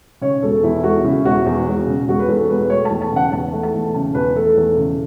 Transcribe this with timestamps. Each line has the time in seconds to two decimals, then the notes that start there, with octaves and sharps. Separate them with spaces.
0.21 C#3 C#5
0.43 E1 A4
0.63 E2 E4
0.77 A4
0.84 E1 F#4
1.04 C#3 E4
1.25 E1 F#4
1.46 E2
1.67 E1
1.87 C#3
2.09 E1 F#4
2.20 B4
2.28 E2 A4
2.49 E1 B4
2.61 B4
2.70 A3 C#5
2.85 A5
2.91 E2
3.02 A5
3.12 C#3 F#5
3.32 E2 A5
3.52 A3
3.63 A5
3.74 E2
3.94 C#3 A5
4.14 E2 B4
4.36 A3 A4
4.57 E2
4.77 C#3